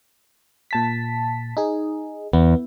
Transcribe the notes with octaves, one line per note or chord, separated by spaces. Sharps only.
A#2 A5 B6
D#4 G#4
E2 B3